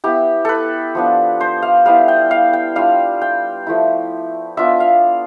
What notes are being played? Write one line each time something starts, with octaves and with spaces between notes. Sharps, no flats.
B3 E4 G4
A4 B4
F3 B3 D4
C5
F5
G3 B3 E4 F5
G5
F5
G5
G3 D4 F4 F5
G5
F3 A3 E4
B3 D4 F4 E5
F5